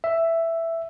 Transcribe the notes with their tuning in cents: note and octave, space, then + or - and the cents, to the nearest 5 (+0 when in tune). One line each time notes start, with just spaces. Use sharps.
E5 +5